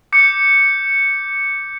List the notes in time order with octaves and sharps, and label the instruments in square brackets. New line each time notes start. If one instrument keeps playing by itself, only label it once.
[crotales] D6 G6 C#7